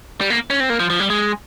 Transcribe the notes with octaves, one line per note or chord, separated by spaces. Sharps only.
G3
A#3
C#4
C4
A#3
F3
F3
G3
G#3